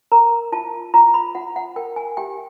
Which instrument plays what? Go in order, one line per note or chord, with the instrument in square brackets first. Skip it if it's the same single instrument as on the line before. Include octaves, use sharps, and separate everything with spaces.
[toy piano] A#4 A#5
F4 A5
F4 A#5
B5
F4 F#5
F#5
A#4 G5
G#5
G4 G5